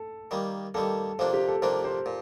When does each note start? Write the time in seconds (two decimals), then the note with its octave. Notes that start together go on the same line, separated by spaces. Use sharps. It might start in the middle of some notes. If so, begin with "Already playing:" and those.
Already playing: A4
0.31 D#3 G3 A#3
0.74 D#3 G3 A#3 A4
1.19 C3 F3 A#3 D4 A4
1.33 G4
1.48 A4
1.62 C3 F3 A#3 D4 A#4
1.84 C5
2.06 A#2